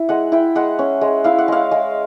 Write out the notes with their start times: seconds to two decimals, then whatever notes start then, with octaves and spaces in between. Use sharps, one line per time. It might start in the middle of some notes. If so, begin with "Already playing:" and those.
Already playing: E4
0.09 G#3 F#5
0.32 E4 G5
0.55 G#3 F#5
0.79 C#4
1.01 G#3
1.24 E4 F5
1.38 F#5
1.48 G#3 F5
1.71 G#3